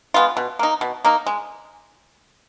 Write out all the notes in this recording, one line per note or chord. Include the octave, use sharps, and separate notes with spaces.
G#3 B3 F4
B2
A#3 D#4
B2
A#3 D#4
G#3